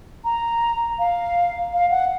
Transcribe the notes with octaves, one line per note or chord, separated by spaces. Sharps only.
A#5
F5
F5
F#5